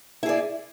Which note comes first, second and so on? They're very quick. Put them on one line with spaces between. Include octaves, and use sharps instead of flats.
E4 G#4 D5